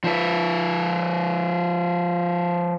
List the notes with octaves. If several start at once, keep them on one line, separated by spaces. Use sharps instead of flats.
F3 B4